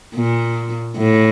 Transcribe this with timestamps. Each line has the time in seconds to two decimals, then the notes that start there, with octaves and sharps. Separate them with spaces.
0.15 A#2
0.98 A2